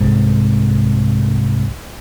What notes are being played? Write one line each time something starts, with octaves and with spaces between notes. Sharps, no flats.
C2 G#2